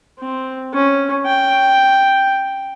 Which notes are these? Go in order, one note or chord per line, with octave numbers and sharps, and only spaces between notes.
C4
C#4
G5